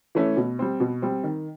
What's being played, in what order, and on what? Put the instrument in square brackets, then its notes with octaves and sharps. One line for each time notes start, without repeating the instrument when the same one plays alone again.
[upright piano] E3 A3 C#4
B2
G3 C4
B2
G3 C4
D#3